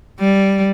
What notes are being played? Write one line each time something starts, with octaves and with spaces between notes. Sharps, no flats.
G3